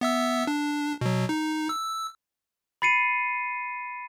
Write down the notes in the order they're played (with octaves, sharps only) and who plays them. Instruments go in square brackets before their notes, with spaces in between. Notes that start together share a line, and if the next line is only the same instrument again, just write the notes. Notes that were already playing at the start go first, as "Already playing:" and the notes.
[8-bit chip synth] B3 E5 E6
D4
B2 F#3
D#4
E6
[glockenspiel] B5 A6 C7 C#7 D#7